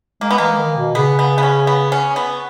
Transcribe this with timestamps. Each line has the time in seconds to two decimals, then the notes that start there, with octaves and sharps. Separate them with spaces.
0.21 G#3 A#3
0.31 B3
0.38 E3 A#3
0.58 D#3
0.77 B2
0.95 C#3 B3
1.19 B3
1.38 B3
1.43 C#4
1.67 B3
1.92 C#4
2.16 B3